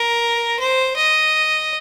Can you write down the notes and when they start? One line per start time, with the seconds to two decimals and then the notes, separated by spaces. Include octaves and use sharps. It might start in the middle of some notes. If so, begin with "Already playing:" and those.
Already playing: A#4
0.59 C5
0.96 D#5